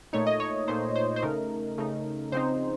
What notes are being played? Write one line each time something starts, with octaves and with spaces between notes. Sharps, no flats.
A#2 A3 D#4 C#5
D#5
C#5
A#2 A3 D#4 C5
C5
C5
C#3 A3 D#4 A#4
C#3 A3 D#4
C#3 F3 C4 D#4 C5